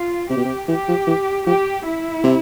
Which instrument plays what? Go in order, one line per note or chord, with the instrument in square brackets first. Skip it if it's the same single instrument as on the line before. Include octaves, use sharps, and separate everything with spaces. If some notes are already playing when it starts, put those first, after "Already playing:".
Already playing: [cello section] F4
[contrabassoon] C3 [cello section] G4
[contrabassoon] B2
C3
[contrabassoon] E3 [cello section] G4
[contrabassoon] F3
E3
[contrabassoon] F3 [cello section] G4
[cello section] E4
[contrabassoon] C3